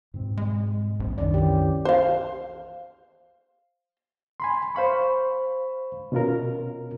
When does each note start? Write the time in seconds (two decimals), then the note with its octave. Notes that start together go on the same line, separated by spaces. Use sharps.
0.14 G#2 B2 C4
0.37 G#3
1.00 A#1 D#2 C4
1.18 C2 F#2 D#3 C#4 D4 D5
1.34 E3 G4
1.85 C5 F5
4.40 G#5 B5 C6
4.75 C5 F5 B5 C#6
6.12 B2 C#4 F4 A#4